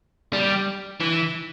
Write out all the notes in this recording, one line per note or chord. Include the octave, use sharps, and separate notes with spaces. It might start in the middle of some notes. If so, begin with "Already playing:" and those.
G3
E3